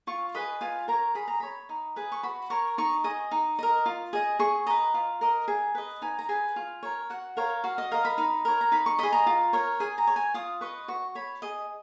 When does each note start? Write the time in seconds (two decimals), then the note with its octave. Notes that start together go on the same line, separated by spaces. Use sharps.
0.07 F4 C#6
0.35 G#4 B4 D#5 B5
0.61 F4 G#5
0.88 A#4 C#5 A#5
1.15 G#4 B5
1.28 A#5
1.40 C#5 B5
1.69 D#4
1.96 G#4 B4
2.12 C#6
2.23 F#4 B5
2.50 A#4 C#5 C#6
2.78 D#4 C#6
3.04 G#4 D#5 D#6
3.31 D#4
3.59 A#4 D#5
3.86 F4
4.13 G#4 D#5
4.39 G#4 C#6
4.66 B4 D#5 A#5
4.94 F4
5.21 A#4 D#5
5.48 G#4
5.75 B4 D#5
6.02 D#4 G#5
6.19 A#5
6.29 G#4 B4 G#5
6.56 F4
6.83 A#4 C#5
7.10 F#4 F#5
7.37 A#4 C#5 F5
7.64 F#4 F5
7.78 D#5
7.91 A#4 D#5 F5
8.05 B5
8.18 D#4
8.45 A#4 C#5
8.61 A#5
8.72 D#4 B5
8.86 C#6
8.99 G#4 D#5 B5
9.12 A#5
9.26 F4
9.53 A#4 C#5
9.80 G#4 G#5
9.98 A#5
10.07 C#5
10.16 G#5
10.34 F4 D#6
10.61 B4 D#5 C#6
10.88 F#4 C#6
11.15 C#5 B5
11.42 G#4 D#5